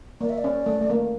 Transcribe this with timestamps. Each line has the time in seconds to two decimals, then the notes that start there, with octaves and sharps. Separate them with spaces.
0.21 A#3 D5
0.30 E5
0.38 D5
0.44 C#4
0.66 A3
0.81 A3
0.90 A#3